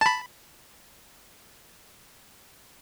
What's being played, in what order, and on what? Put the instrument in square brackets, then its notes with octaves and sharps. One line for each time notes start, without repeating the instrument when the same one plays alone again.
[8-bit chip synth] A5 B5